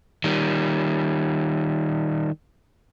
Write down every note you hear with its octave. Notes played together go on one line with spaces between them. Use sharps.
D#3 G3